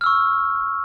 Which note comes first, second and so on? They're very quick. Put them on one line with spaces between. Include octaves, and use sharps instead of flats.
F6 E6 C#6